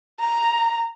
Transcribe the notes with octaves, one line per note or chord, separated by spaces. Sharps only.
A#5